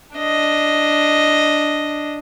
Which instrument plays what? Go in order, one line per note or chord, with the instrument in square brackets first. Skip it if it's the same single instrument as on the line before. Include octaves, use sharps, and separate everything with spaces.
[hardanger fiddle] D4 D#5